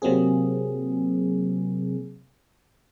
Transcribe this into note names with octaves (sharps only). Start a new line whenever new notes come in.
C3 F#3 A#3 C4 G#4